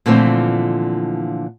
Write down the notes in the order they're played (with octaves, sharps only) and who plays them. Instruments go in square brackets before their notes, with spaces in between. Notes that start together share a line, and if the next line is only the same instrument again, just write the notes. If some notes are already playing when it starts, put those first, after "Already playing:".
[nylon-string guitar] A#2 D3 E3 F3 A3 C4